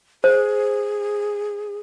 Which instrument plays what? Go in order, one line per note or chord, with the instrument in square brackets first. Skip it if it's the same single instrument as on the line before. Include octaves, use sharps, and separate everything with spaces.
[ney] G#4 [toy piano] C5